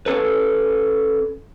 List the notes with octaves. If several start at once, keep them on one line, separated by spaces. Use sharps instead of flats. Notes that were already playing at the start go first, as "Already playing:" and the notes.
C#4 A4 B4